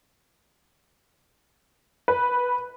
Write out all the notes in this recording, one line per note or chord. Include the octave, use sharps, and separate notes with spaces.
B4